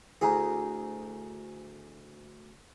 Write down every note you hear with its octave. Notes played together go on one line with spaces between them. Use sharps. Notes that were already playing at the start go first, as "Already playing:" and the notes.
D2 E4 G#4 G#5 A#5